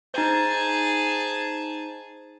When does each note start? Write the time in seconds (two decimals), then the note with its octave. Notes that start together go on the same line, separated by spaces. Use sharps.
0.14 D#4 G#4 C5 A5